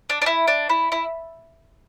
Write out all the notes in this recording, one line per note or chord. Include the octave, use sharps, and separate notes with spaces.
D4
D4
E4
D4
E4
E4